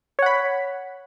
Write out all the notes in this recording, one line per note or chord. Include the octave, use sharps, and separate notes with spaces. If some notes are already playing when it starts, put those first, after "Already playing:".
C#5 F#5 B5